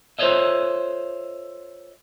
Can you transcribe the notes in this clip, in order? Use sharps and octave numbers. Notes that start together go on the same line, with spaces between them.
F4 A4 C5 C#5 D#5 E5